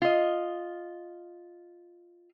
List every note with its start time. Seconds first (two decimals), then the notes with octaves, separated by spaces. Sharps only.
0.02 F4 D#5